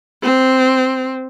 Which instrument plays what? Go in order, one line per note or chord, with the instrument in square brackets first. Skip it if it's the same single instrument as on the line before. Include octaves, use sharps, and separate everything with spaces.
[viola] C4